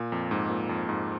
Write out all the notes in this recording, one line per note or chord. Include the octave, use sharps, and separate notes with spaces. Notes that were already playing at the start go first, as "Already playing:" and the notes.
Already playing: A#2
F2
G#2
A#2
F2
G#2